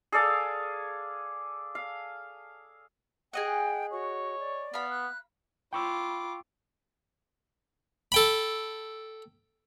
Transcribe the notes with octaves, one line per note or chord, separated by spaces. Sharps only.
G#4 A4 D5 F5
F5
G#4 D#5 F#5 G5
F#4 C#5
D5
B3 F5 B5
F#6
F4 G5 B5 C#6 D6 E6
A4 G5 B5